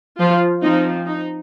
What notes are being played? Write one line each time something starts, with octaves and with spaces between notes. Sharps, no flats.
F3 F4
F3 C4 D#4
D#4